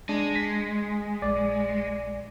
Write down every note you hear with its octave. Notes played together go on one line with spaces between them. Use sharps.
G#3 D4
B6
A#1 D5